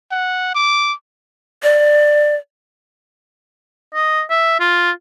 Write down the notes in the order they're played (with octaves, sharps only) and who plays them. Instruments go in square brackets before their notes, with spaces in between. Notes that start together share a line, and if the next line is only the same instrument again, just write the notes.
[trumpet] F#5
D6
[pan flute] D5
[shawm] D#5
E5
F4